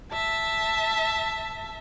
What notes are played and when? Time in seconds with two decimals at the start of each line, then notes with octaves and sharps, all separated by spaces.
0.12 E5 A5